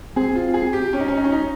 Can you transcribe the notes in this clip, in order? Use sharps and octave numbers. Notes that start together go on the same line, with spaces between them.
C4 G#4
F4
G#4
G4
C#4
D#4
C#4
D#4
C#4
D#4